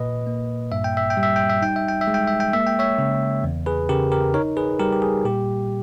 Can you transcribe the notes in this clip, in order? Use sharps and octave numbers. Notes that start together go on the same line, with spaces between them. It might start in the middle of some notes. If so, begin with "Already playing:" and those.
Already playing: A#2 B4 D#5
A#3
G2 E5
G5
E5
G5
G3
E5
G5
E5
D#4 G5
E5
G5
E5
G#3
G5
E5
G5
A#3 E5
G5
C#5 E5
C#3
E2
G#4 B4
C#3 G4 A#4
G4 A#4
D#4 A#4 C#5
G#4 B4
G3 G4 A#4
G4
G#4
A#2 G4